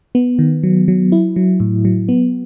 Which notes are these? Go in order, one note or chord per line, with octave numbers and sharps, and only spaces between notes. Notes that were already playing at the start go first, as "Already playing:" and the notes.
B3
D#3
F#3
F#3
E4
F#3
A2
F#3
B3